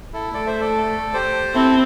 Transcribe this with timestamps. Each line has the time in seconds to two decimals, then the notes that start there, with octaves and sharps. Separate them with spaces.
0.13 E4 A4
0.33 A3 A4 D5
0.47 C5 E5
0.61 A4 D5
1.14 G4 C5
1.54 C4 E4 A4